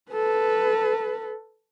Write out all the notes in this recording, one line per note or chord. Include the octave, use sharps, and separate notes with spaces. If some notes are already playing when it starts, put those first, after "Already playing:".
A4 B4